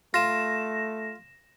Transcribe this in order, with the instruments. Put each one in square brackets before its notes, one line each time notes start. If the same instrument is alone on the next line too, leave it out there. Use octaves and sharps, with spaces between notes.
[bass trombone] A3 [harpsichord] F4 [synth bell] A#6 E7